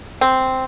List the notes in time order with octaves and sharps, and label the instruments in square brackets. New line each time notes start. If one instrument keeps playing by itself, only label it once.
[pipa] C4